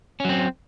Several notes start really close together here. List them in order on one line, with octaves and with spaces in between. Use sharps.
C#4 F#3 C4